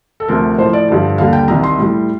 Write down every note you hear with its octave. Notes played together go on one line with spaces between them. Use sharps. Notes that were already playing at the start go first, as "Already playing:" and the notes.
A4
D2 C3 F3 A#4
A2 F3 C5
D5
G2 D3 F3
D#2 D3 G3 F5
G5
C2 C3 D#3 A#5
C6
A2 G3